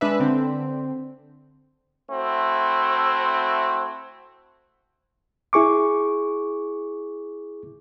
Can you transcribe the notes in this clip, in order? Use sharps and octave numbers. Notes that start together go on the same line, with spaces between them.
G#3 D4 B4 E5
D3 C4
A3 C4 E4 F#4
E4 G#4 C#6 D6